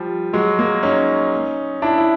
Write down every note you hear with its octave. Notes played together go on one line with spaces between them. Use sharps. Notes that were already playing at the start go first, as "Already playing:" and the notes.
Already playing: F3 G3
F#3 G#3
G#3 A#3
C#4 D#4
D4 E4
E4